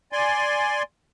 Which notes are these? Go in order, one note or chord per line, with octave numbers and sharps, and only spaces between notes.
D5 G#5 C6